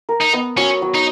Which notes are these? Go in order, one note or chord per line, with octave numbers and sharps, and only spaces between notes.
A#4
D#4
B3
F#3 C#4
F#3
D#4